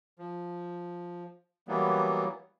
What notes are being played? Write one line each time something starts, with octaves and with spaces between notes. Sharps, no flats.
F3
E3 F#3 G3 A#3 B3